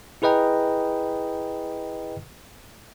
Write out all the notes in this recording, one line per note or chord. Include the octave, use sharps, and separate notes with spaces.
E4 G#4 B4 D#5 G5 A#5